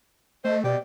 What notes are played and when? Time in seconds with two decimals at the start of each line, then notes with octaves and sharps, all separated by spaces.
0.44 A3 C5 D#5
0.64 B2 G4 D5